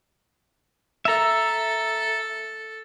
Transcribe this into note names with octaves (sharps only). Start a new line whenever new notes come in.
A4 E5 A#5